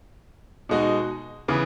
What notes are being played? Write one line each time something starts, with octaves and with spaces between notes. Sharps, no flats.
B2 G#3 D#4 F#4
C#3 E3 B3